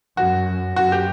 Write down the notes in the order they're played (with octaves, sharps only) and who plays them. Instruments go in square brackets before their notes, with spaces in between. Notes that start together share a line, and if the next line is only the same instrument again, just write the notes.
[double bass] F#2 [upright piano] F#4
[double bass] F#2 [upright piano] F#4
[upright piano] G4